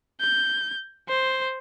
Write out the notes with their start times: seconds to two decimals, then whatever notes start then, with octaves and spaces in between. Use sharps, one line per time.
0.21 G6
1.09 C5